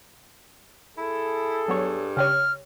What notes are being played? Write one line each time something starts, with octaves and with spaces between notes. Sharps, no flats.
E4 G#4 A4
G2 F#3 B3 C#5
C#3 G4 C#5 F6